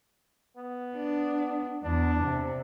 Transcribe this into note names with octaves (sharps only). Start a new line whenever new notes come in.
B3
D4
E2 D4
C3